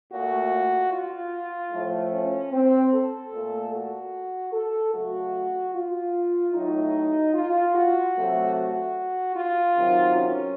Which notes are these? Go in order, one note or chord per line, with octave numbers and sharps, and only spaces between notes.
A#2 A3 F#4
F4
A2 F3 A3
C#4
C4
A4
A#2 A3
F#4
A4
C#3 F#3 A3 F#4
F4
A2 F#3 A3 D#4
F4
F#4
C3 F#3 A3
F#4
F4
C3 D#3 F#3
C#4